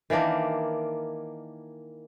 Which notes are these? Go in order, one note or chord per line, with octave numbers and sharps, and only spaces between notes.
D#3 E3 A#3 D4